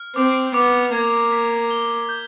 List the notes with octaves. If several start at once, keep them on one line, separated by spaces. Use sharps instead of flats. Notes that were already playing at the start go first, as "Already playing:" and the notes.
Already playing: F6
C4 D6
B3 D6
A#3 G#6
B6
G7
G6